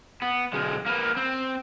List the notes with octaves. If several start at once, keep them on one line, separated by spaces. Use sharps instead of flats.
B3
B1 G#3
A#3 B4
C4